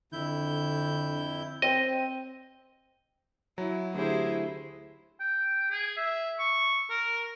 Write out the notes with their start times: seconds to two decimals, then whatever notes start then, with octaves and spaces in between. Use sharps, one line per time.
0.12 F2 D3 E4 G6
1.62 C4 D#5
3.58 F#3 E4
3.94 D2 E4 G4 G#4 C5
5.20 G5
5.71 G#4
5.97 E5
6.39 C#6
6.90 A#4